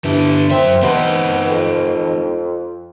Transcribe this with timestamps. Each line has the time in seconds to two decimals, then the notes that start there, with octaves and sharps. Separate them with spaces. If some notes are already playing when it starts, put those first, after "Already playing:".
0.04 G2 D3 E3
0.51 F#2 C4 E5
0.83 B3 C4 D#4
1.48 F2